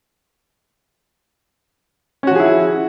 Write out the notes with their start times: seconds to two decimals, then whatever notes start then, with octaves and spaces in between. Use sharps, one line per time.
2.23 C#4
2.27 F#4
2.31 F3
2.35 G#4
2.40 E4